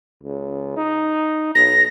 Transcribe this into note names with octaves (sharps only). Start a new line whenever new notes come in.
C#2
D#4
B1 A#6